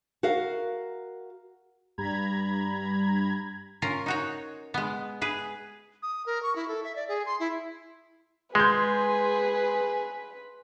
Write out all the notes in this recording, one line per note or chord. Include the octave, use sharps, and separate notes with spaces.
F#4 A#4 F5
G2 G3 A#5 B5 G#6
C#4 F4 A#4
D#4 F#4 C#5
G#3 B3
G#4 B4
D#6
A#4
C#6
E4
A4
E5
D5
G#4
C6
E4
G#3 G#4 B4 C6 G6